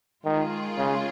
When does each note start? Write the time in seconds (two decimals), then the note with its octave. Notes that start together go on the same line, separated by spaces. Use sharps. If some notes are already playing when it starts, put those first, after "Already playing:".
0.25 D#3 G#3 F4 G#4
0.78 C#3